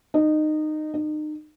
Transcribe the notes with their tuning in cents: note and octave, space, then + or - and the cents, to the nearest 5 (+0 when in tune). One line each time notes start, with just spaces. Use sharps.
D#4 -20
D#4 -35